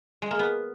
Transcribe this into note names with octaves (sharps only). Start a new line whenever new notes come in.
G#3
A#3
B3